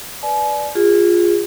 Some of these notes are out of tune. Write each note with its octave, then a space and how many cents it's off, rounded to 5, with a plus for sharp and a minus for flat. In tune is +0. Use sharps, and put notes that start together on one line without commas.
B4 +0 D5 +0 G#5 +40
F4 +0 G#4 -25